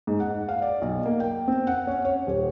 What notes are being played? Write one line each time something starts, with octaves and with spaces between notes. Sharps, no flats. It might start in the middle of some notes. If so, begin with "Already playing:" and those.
G#2
F#5
F5
D5
B1
A#3
G5
C4
F#5
C#4
C#5
D#1